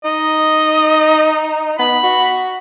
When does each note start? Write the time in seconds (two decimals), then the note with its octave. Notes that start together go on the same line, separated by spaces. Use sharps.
0.05 D#4 D#5
1.79 B3 B5
2.03 F#4